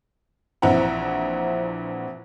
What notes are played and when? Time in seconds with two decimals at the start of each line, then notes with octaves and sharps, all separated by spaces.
0.62 A#1 E3 C4 E5 F#5 A#5